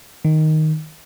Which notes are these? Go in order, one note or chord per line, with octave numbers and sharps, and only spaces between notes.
D#3